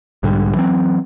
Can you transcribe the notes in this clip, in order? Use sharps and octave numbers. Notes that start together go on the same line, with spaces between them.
B1 G#2 D3 G3
E3 F#3 A3 C4